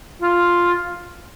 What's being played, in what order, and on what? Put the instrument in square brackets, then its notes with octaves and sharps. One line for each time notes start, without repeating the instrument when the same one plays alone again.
[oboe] F4